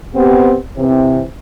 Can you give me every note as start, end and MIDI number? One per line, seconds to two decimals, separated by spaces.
0.15 0.55 59
0.15 0.55 60
0.15 0.55 67
0.77 1.21 48
0.77 1.21 52
0.77 1.21 60